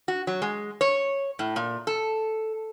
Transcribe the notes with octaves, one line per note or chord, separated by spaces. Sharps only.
F#4
F#3
G#3
C#5
A2
A#2
A4